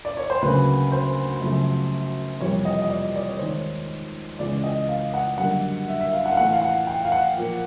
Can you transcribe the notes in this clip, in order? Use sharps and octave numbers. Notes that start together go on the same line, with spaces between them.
D5
C#5
C5
D2 C#3 F#3 A#3 B4
C5
F#2 C#3 F3 A3
F2 C3 E3 G3 A#3 C#5
D#5
D#5
D5
D5
C#5
D#2 D#3 G#3 C5
C#5
C#2 C#3 E3 G#3 D5
D#5
F5
F#5
F#2 D3 G3 A#3 F#5
E5
E5
F5
F#5
F5
A2 E3 A3 F#5
F5
F#5
G5
F5
F#5
A#2 F3 A#3